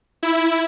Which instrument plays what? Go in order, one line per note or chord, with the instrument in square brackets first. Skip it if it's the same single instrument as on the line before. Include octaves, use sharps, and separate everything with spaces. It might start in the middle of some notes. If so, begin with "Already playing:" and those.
[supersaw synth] E4